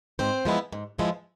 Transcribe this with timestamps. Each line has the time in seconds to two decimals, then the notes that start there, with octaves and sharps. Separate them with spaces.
0.19 G#2 C4 C5
0.45 F3 G#3 B3 E4
0.72 G#2
0.98 F3 G#3 B3 E4